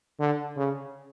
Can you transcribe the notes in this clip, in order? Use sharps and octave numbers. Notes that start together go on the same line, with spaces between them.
D3
C#3